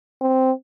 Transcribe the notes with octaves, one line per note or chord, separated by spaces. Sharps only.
C4